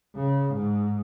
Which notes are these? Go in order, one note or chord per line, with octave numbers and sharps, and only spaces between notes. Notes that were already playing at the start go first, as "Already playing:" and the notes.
C#3
G#2